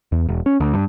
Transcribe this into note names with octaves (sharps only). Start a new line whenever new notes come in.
E2
E1
C#4
D2
G2